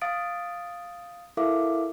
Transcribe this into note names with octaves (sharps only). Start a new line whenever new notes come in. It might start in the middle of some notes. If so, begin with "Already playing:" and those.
F5 D#6 A6 D7
E4 A4 A#4 E5 F5 D6